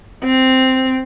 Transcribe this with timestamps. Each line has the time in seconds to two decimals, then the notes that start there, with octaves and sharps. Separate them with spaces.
0.24 C4